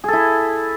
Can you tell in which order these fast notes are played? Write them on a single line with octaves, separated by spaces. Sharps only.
G#4 A4 E4